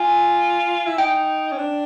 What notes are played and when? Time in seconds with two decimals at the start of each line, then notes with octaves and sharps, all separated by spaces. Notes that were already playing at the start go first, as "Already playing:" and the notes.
Already playing: F4 G#5
0.86 E4
0.98 D#4 G5
1.52 C#4
1.58 D4